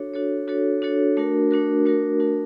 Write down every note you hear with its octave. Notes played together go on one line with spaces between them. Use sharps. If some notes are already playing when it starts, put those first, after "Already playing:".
Already playing: D4 F#4 A4 C#5
D4 F#4 A4 C#5
D4 F#4 A4 C#5
D4 F#4 A4 C#5
A3 D4 F#4 A#4
A3 D4 F#4 A#4
A3 D4 F#4 A#4
A3 D4 F#4 A#4